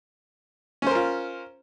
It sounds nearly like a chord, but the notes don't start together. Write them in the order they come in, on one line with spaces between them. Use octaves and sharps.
C#4 C5 A#4 F4